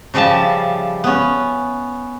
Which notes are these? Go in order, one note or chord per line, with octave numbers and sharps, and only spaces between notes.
C#3 F3 G3 E5 A5
B3 C#4